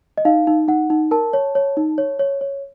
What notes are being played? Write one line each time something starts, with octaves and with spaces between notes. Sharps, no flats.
D#5
D#4 F5
D#4
D#4 F#5
D#4
A#4 A5
C#5
C#5
D#4
C#5
C#5
C#5